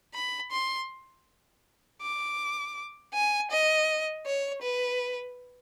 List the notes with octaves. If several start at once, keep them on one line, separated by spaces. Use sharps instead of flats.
B5
C6
D6
G#5
D#5
C#5
B4